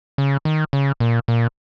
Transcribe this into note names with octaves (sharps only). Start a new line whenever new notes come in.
C#3
D#3
C#3
A#2
A#2